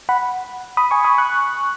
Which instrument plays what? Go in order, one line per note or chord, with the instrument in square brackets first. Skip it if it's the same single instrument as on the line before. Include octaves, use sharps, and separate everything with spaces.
[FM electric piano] F#5 B5
B5 D#6
G#5 C#6
B5 D#6
C#6 F#6